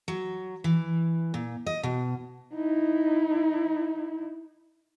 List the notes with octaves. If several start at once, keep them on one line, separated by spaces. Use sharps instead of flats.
F#3
E3
A#2
D#5
B2
D#4 E4